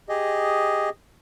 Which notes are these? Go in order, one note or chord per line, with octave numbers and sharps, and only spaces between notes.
G4 G#4 D#5